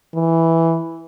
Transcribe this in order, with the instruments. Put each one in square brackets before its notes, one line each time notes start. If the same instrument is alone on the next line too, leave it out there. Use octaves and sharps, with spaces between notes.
[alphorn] E3